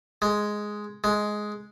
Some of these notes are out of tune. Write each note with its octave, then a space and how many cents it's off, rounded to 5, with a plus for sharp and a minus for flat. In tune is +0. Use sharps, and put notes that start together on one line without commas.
G#3 +5
G#3 +10